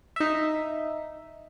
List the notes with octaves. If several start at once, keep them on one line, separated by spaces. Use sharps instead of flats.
D#4 E5